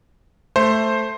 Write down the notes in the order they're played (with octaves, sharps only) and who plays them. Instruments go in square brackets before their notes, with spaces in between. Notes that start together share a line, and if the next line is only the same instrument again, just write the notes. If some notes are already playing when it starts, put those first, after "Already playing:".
[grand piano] A3 [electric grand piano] C5